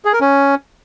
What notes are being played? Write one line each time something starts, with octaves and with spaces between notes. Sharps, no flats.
G#4
A#4
C#4